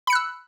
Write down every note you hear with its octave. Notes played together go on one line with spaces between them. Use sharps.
B5 E6 F#6 C#7